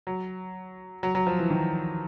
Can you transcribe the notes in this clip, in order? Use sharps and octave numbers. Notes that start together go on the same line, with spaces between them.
F#3
F#3
F#3
F3
E3
D#3